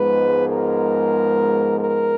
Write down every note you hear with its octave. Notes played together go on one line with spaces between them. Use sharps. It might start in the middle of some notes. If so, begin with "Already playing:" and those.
Already playing: G#2 F3 G#3 B3 B4
A#4
A#4